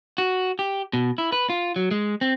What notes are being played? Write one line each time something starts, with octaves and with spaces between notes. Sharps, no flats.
F#4
G4
B2
E4
B4
F4
F#3
G#3
C4